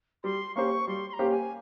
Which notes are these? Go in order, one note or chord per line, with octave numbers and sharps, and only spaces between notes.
G3 C6
A#3 C#4 G4 C5 C#6
G3 C6
C6
A#5
A#3 C#4 G4 C5
G#5